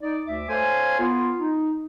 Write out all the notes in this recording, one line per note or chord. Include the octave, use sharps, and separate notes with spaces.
D#4 D5
D2 E5 D6
A4 C5 C#5 F5 G#5
B3 F4
D#4